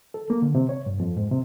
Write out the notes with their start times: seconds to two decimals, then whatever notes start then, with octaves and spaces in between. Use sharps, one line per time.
0.14 A4
0.30 A#3
0.42 D3
0.55 C3
0.69 C#5
0.86 G2
1.00 F2
1.17 G#2
1.31 C3